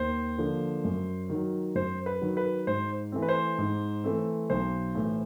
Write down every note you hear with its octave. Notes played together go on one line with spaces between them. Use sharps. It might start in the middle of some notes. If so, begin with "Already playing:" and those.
Already playing: D#2 C5
D3 F3 A#3
F#2
D#3 F#3
F#2 C5
B4
D#3 F#3
B4
G#2 C5
E3 A3 C4
B4
C5
G#2
E3 A3 C4
B1 C5
A2 E3